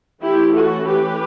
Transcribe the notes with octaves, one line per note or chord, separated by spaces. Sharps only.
E3 A3 C#4 E4 G4
F#4 A4
G4 B4